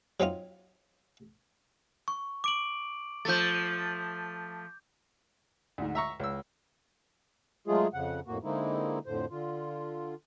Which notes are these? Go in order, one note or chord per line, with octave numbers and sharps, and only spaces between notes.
F#3 C4 D#4 F4
C#6
D6 D7 F#7
F3 A3 G6 A6
D2 G#2
E5 A#5 C#6
C#2 E6
F#3 G#3 A3 F4 G#4
F2 C#3 F#5
F2 A2 A#3 F#4
D3 G#3 A#3 C4 D#4 E4
F2 A2 D3 C5
D3 F4